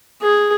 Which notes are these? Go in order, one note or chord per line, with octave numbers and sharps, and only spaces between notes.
G#4